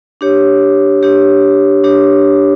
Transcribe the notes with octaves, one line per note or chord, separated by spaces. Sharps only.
D4 G4 C#5
D4 G4 C#5
D4 G4 C#5